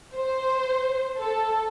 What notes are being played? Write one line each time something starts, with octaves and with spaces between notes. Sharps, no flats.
C5
A4